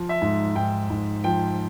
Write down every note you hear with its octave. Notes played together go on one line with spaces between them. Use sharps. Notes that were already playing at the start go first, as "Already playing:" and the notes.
Already playing: F3
E5
G#2
G#2 G5
G#2
F3 G5